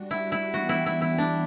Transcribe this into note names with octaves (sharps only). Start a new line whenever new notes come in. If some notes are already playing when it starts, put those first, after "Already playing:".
Already playing: G3 D4 F#4
E4
E4
E3 G3 B3 D4 F#4 G4
E4
E4
E4
D4